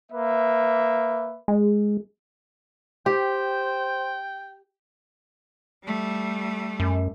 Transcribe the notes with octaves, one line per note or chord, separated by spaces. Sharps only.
A#3 B4 E5
G#3
G4 C5 G5
G3 A3
F#2